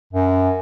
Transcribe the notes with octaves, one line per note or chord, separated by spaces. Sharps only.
F#2